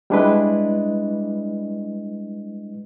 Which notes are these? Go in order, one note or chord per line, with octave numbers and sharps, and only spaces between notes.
G3 G#3 D4 E4 B4 D#5